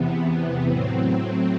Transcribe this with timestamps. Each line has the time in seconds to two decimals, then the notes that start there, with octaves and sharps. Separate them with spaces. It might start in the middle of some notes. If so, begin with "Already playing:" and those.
Already playing: E2 C3 E3 B3
0.66 A2 F#3 C4